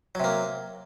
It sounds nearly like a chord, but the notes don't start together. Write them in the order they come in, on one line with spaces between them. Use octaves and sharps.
F#3 C3 A#3